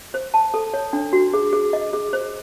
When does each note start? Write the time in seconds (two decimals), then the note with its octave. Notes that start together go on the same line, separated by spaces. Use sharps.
0.14 C5
0.34 A5
0.54 A4
0.74 C#5
0.93 D4
1.13 F#4
1.33 G#4
1.53 G#4
1.73 D#5
1.93 G#4
2.13 C5